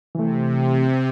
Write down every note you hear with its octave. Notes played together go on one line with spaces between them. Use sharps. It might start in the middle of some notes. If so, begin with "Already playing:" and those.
C3 E3 A3